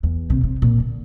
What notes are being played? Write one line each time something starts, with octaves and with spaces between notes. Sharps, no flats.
E2
A#1 C3
C3
A#2
D3